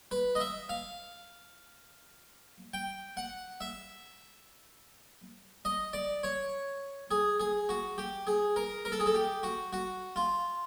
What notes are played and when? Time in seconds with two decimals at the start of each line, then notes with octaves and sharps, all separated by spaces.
0.11 B4
0.35 D#5
0.40 E5
0.69 F5
2.74 G5
3.17 F#5
3.61 E5
5.65 D#5
5.93 D5
6.23 C#5
7.11 G#4
7.40 G#4
7.69 F#4
7.98 G4
8.27 G#4
8.56 A#4
8.85 A#4
8.92 A4
9.00 G#4
9.06 A4
9.15 G4
9.43 F#4
9.73 F#4
10.16 F4